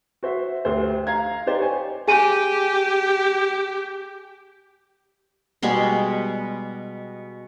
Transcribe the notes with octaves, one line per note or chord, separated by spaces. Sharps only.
F#4 C5 E5
D2 G4 C5
F5 A#5 G#6
D#4 G4 C5 D5
C#5 G#5
G4 G#4 G#5 D#7
B2 G3 G#3 C6